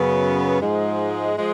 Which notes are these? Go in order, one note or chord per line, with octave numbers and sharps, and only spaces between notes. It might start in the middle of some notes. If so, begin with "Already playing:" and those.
Already playing: F#2 C#3 F#3 B3
G#2 F3 G#3
F3 G#3